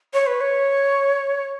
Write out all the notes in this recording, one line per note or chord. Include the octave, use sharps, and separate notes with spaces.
C#5
B4
C#5